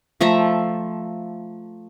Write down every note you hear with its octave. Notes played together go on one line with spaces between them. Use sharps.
F3 A3 E5 A#5